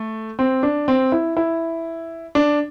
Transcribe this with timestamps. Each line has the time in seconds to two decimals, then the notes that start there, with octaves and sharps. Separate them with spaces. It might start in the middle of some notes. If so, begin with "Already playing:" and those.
Already playing: A3
0.39 C4
0.63 D4
0.88 C4
1.12 E4
1.37 E4
2.35 D4